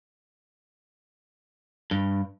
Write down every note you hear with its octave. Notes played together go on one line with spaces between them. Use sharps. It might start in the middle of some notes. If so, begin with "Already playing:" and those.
G2